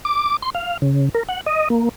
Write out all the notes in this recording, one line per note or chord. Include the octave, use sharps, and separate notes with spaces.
D6
C6
F5
C#3
A#4
F#5
D#5
A#3